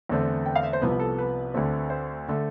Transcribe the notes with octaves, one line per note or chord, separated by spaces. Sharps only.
E2 D3 A3 C4
G5
F5
E5
C5
C2 C3 F3 B3 B4
A4
B4
D2 D3 A3 C4
C5
D3 A3